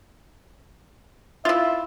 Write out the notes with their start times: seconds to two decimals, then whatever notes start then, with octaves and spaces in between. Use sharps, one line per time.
1.45 E4 F4 E5